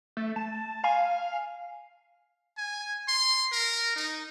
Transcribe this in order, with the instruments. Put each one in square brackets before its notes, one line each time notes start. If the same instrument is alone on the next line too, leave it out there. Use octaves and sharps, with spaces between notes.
[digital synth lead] A3
A5
[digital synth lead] F5 [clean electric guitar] G#5
[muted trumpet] G#5
C6
A#4
D#4